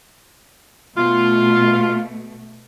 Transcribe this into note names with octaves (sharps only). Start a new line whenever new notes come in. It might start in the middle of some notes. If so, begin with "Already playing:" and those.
B2 A3 F4